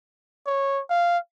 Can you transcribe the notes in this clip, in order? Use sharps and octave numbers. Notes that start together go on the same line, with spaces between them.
C#5
F5